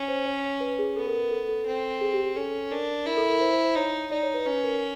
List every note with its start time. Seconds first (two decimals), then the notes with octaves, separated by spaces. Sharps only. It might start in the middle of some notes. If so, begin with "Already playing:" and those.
Already playing: C#4
0.08 C5
0.26 C#5
0.61 B4
0.79 G#4
0.96 B3 A4
1.07 A#4
1.19 A#4
1.31 A4
1.49 A4
1.66 C4
2.01 G#4
2.13 G4
2.24 G#4
2.36 C#4 A4
2.71 D4 A#4
3.06 E4 A#4
3.17 A4
3.30 A#4
3.41 C5
3.53 C5
3.65 C5
3.75 D#4 C#5
4.11 D#4 D5
4.23 C#5
4.34 B4
4.46 C#4 B4
4.64 A#4